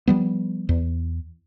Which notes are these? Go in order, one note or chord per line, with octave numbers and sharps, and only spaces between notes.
F3 G3 B3
E2